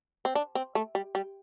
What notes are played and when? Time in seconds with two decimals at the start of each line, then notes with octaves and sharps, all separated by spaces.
0.25 C4
0.35 D4
0.55 C4
0.75 A3
0.95 G3
1.15 G3